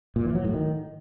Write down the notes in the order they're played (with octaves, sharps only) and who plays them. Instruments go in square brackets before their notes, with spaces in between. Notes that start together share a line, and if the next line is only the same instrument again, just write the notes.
[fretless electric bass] A#2
E3
F#3
A2
D#3